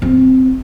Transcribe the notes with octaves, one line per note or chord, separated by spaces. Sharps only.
C4